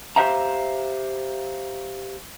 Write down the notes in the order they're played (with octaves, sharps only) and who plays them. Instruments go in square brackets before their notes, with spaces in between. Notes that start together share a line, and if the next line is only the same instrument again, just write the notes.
[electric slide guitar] G4 C5 E5 F5 A#5